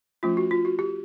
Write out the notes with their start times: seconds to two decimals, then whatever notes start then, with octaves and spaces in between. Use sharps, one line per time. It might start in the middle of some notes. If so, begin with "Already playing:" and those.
0.23 F3 A3 C#4 F4
0.37 F#4
0.51 F4
0.65 F#4
0.79 G4